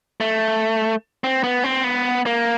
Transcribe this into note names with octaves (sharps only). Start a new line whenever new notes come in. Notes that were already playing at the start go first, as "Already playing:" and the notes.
A3
C4
B3
C4
B3
A#3